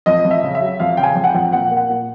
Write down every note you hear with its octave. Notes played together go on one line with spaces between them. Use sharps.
F2 D#5
F2
E5
C#3
E5
F#3
F2 F5
C#3 G5
G#5
F2
F#5
G5
F2
A#2 F#5
A#3
F#5
A#2